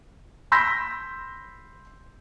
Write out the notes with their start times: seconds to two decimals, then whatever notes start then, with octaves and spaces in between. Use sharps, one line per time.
0.52 B5 C6 E6 G6 A#6 B6